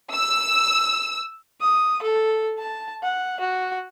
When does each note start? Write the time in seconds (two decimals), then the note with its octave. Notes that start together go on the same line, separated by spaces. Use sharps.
0.13 E6
1.61 D#6
2.02 A4
2.58 A5
3.03 F#5
3.40 F#4